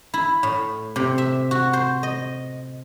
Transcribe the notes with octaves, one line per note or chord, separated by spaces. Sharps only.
E4
A2
C3
E5
F#4
C5
D#5